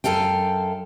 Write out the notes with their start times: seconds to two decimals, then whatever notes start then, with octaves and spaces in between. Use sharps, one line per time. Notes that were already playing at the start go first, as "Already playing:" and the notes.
0.04 F#2 D#3 A4 F5 G5